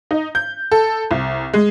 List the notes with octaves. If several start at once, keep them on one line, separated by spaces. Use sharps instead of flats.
D#4
G6
A4
C2
G#3